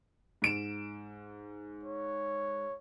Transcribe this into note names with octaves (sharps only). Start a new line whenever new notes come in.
G#2 D7 E7
C#5